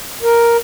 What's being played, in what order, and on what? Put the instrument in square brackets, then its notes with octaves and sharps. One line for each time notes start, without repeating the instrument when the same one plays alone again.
[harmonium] A#4